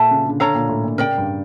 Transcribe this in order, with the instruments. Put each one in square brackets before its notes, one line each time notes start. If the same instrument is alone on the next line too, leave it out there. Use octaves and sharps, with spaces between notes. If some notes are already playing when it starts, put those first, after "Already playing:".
Already playing: [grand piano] A#2 [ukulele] A4 E5 A5
[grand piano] C#3
D3
[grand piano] D3 [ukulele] A4 C#5 F5 A#5
[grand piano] A#2
A2
A#2
[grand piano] C#3 [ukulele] A#4 D5 G5
[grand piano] G2